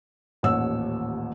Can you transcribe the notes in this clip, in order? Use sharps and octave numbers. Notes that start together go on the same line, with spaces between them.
D#1 A1 D#2 C#5 F#5 E6